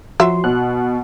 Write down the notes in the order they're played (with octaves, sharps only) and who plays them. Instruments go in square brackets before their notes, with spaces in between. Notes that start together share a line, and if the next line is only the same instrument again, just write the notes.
[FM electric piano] F3 C6 [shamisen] F#3 E5 [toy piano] F#4
[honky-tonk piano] B2 [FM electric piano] F#6